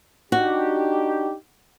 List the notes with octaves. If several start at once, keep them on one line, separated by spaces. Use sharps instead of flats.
D4 D#4 F#4 G4